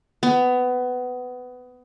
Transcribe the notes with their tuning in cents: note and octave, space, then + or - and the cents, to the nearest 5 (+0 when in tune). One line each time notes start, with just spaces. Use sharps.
B3 +20